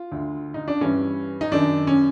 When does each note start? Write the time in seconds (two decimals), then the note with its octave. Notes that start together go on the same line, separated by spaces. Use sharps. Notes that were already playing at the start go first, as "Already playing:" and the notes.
Already playing: F4
0.11 D2 D3
0.54 D#4
0.68 D4
0.81 G2 E3 C#4
1.41 D#4
1.51 F#2 D#3 D4
1.87 C#4